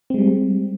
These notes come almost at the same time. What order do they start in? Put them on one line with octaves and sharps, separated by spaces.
C4 G#3 G3